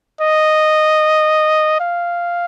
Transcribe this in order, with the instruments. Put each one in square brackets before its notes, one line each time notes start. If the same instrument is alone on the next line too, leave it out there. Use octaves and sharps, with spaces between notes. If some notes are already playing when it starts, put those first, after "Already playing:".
[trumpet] D#5
F5